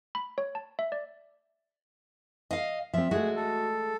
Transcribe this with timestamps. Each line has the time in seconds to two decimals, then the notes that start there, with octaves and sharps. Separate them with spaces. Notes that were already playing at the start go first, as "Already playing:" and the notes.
0.15 B5
0.38 C#5
0.55 A5
0.79 E5
0.92 D5
2.51 D#5 F5
2.93 F3 C4 E5
3.11 G#3 A3 F#4 G#4
3.36 A4